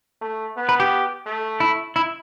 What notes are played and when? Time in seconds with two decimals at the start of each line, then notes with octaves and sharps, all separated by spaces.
0.22 A3
0.57 B3
0.69 B4
0.80 G4
1.26 A3
1.60 E4
1.96 E4